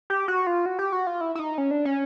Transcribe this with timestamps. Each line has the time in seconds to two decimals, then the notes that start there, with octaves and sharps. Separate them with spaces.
0.10 G4
0.28 F#4
0.47 F4
0.66 F#4
0.79 G4
0.92 F#4
1.07 F4
1.21 E4
1.35 E4
1.39 D#4
1.58 C#4
1.71 D4
1.85 C#4